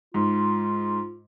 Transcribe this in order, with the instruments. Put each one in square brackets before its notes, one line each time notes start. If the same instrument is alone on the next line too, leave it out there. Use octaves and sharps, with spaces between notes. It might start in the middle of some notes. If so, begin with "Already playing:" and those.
[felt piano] G#2 [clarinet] F4